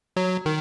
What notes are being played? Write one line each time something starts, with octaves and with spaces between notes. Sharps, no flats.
F#3
D#3